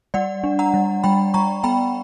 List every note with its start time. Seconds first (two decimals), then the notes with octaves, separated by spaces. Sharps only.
0.14 G3 D5 F#5
0.44 D4
0.59 F#5 A#5
0.74 G3
1.04 G3 G5 B5
1.34 G3 A#5 C#6
1.64 B3 G5 B5